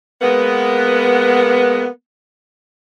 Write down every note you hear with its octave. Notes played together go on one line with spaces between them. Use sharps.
G#3 A#3 B3